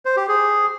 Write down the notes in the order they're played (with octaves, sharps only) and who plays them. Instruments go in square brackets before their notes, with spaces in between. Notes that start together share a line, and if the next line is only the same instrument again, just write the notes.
[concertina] C5
G4
G#4